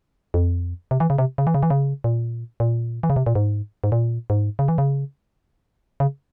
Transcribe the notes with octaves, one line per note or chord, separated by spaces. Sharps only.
F2
C3
E3
C#3
C3
C#3
E3
C#3
E3
C#3
A#2
A#2
E3
C#3
C3
A#2
G#2
G#2
A#2
G#2
C#3
E3
C#3
C#3